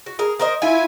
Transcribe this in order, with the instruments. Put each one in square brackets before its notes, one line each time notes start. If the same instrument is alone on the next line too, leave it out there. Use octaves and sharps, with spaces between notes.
[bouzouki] F#4
G#4 A#4
A#4 C5 D#5
[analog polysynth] E4 G#5 [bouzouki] F4